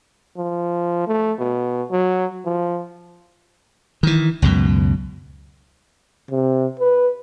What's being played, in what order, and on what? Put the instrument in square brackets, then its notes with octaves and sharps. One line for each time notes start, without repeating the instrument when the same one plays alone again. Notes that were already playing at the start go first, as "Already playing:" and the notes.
[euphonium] F3
A3
B2
F#3
F3
[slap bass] D#3 E3
C#2 F#2 B2
[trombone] C3
B4